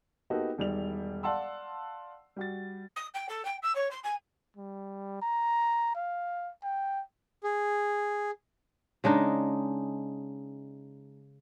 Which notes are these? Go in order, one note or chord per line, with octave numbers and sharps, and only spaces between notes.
A#3 B3 D#4 F#4 G4 A4
E1 D#3 G3 D5 F7
D5 F5 F#5 A5 C6 E6
G3 F#4 A6
D#6
G5
A4
G5
E6
C#5
C6
G#5
G3
A#5
F5
G5
G#4
C#3 G#3 D4 D#4